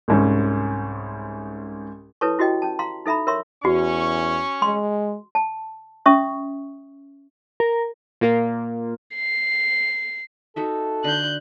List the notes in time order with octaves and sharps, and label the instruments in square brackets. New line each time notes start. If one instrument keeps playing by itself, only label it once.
[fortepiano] C2 G#2 C#4
[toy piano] E4 A4 B4 C#5 A5 C#6
E4 F#4 G4 D#5 G5
C#4 A5
F5 A#5 C6
D#4 A4 E5 A#5 B5
A#4 C#5 E5 C6 C#6
[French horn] E2 [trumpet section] C#4 C#6 [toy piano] F#4
[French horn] G#3 [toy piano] C6
[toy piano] A5
C#4 E5 C#6 D#6
[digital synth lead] A#4
[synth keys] A#2 A#3 F4
[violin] C7
[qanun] D#4 F#4 E5 [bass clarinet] A4
[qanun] D3 [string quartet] F#6 G6